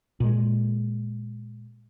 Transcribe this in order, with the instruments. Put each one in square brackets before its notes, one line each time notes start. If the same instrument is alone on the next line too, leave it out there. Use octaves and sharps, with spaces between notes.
[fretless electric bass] A#2 G#3